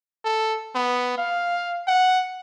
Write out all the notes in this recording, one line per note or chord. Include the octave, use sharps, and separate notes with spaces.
A4
B3
F5
F#5